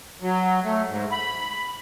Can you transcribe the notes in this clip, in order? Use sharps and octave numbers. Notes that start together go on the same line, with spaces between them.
F#3
A3
G#2
B5